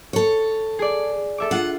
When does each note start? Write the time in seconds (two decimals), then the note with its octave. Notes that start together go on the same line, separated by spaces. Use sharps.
0.13 A4 C#5
0.79 G#4 D5
1.38 A4 E5 D6
1.51 D4 F4 F#5